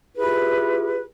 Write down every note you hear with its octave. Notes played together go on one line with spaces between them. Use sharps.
E4 F4 G4 G#4 B4